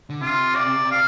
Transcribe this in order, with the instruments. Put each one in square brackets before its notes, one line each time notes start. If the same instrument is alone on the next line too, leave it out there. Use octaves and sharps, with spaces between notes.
[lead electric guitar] D3
[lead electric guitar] C3 [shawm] F4
[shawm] D5
F5